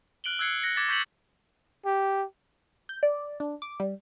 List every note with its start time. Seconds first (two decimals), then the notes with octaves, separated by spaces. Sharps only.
0.24 F6 F#6 D7 F#7 G7
0.39 E6 F#6 G#6 C7 C#7
0.62 F#6 A#6 C#7
0.76 D6 G#6 A6 B6
0.89 C#6 G6 B6 C#7 F#7
1.85 G4
2.89 G6
3.03 D5
3.40 D4
3.62 D6
3.80 G3